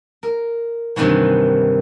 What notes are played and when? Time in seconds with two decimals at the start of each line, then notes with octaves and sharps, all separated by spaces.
0.23 A#4
0.96 G2 C3 D#3 E3 F#3